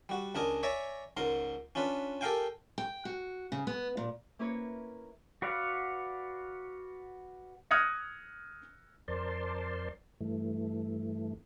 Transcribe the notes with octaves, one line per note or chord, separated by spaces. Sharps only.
G3 F#4
C#2 D4 A#4 D#5 G#5
C#5 D5 E5 G#5 A#5
C#2 G#2 A#4 C6
C#4 D4 F4 B4
G4 A4 A#4 F5 G5 G#5
G5
F#4
C#3
B3
A#2
A#3 C#4 E4 A#4 B4 C#5
F#4 B4 D5 F5 F#5
D#6 F6 F#6 G#6 A#6 C#7
F2 A#4 C5 D5 A5 C6
G2 E3 A3